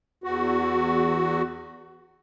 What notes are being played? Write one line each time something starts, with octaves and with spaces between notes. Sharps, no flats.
E2 F#4